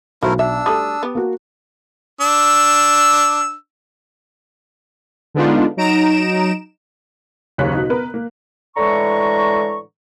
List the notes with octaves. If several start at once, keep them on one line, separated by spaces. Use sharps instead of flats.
B1 A3 E4 F#4 A#4 C5
D4 E5 E6
G3 A3 A5 D#6
B3 G4
A#3 F#4
D4 E6
D3 G#3 B3 D4 D#4 F4
F#3 D#4 A#5 D7 E7
F#1 D#2 C#3 C#4 F#6 B6
B2 D#4
B3 A#4 B4
A#3
A2 D3 E3 G#3 A#5 C#6